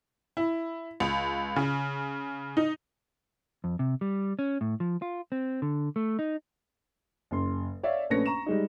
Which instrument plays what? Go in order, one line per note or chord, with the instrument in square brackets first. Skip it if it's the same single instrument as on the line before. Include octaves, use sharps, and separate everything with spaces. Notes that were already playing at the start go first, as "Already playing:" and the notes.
[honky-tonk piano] E4
C#2
C#3
D#4
[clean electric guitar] F2
C3
G3
C#4
A2
F3
F4
C4
D3
A3
D#4
[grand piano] F#1 C6
C#5 D5 E5 F5
A#1 A3 C#4 B4 A#6 C#7
A#5 C#6 E7
G3 G#3 D#4